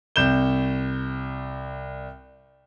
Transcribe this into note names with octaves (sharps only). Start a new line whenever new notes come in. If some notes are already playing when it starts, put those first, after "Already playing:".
C2 G6 E7 G7